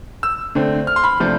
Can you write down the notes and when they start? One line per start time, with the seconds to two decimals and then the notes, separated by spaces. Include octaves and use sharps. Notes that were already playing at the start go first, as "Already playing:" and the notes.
0.23 E6
0.55 D3 A3 C4
0.87 F6
0.96 C6
1.04 B5
1.20 C3 F3 A3 D4